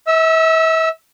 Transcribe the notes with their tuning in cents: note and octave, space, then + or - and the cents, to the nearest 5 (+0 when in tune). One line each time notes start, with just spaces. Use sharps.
E5 -35 E6 +0